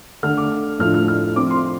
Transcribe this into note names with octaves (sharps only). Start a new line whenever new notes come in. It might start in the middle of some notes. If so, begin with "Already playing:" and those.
D3 A3 D4 F6
D6
A2 F3 A3 D4 F6
F6
F6
F3 C4 D6
C6